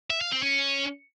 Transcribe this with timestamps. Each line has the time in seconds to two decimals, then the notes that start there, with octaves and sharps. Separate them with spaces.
0.10 E5
0.21 F5
0.32 C4
0.43 C#4